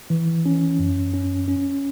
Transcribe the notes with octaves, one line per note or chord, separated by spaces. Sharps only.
E3
C#4
F#2
C#4
C#4